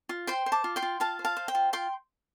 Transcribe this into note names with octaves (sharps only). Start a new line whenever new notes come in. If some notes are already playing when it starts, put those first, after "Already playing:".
F4
C5 G5 C6
C5
A5 D6
F4
G5 C6
F4
F4 F5 A5
C5
F5 A5
C5
G5
F4
F4 G5 C6